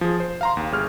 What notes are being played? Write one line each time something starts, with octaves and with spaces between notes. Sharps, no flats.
F3 G#4
C5
F5 A#5 C6
D#2
G1 G#4 F6